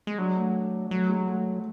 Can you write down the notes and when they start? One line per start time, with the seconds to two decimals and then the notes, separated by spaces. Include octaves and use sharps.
0.07 G#3
0.18 F#3 D4
0.36 A3
0.91 F#3 A3
1.09 G#3
1.27 A3